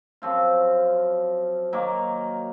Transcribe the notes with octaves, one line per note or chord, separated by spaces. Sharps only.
F#2 F3 C4 F4
D#3 F#3 A#3